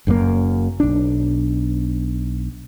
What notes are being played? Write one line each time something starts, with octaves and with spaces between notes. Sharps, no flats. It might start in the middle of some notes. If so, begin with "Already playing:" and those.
F#1 F#2 C#3 A#3
B1 D4